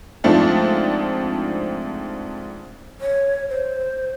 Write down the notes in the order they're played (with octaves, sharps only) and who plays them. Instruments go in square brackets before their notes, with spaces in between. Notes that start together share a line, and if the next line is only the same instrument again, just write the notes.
[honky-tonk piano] G#2 F3 A3 C4 D4 F4
[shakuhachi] C#5
C5